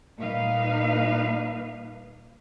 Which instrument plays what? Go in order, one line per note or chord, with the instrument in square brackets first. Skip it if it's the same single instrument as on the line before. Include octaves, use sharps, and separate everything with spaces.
[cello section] A#2 G3 A#3 D#4 B4 F5